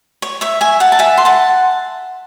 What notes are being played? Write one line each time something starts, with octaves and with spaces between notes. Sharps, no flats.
C#5
C#5 E5
E5 G#5
F#5 A5
A5
E5 G#5
C6
F#5 A5